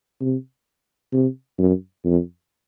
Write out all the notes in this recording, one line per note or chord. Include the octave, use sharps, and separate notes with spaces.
C3
C3
F#2
F2